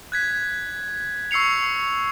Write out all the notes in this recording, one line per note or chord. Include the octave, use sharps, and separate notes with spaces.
F#6 G#6 B6
C#6 E6 C7 C#7 F7